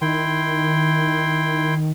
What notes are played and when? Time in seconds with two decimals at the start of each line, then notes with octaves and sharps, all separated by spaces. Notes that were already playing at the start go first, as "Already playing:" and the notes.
0.01 D#3 E4 G5 C6